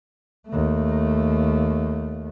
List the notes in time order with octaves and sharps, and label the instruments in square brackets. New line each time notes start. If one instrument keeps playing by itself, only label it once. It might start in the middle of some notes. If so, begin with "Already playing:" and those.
[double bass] D#2 A3